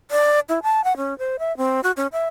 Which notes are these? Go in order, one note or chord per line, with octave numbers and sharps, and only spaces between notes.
D5
E4
A5
F#5
C#4
C5
E5
C4
F#4
C#4
E5